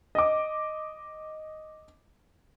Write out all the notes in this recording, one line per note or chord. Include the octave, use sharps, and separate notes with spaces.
D#5 D6